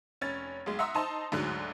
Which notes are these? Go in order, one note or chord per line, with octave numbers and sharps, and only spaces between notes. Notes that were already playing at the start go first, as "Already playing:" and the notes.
F1 C#4 G#6 A6
B1 G#3
E5 F#5 A#5 C6 D#6 E6
D#4 C5 D#5 A5 A#5 C6
D2 G#2 D3 F#3 F#6